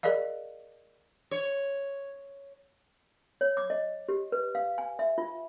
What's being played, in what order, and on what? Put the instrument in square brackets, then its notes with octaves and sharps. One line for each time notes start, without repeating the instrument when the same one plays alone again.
[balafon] G#4 A#4 D5 D#5 F5
[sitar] C#5
[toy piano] C#5
D6
D#5
G4
B4
F5
G#5
E5
F4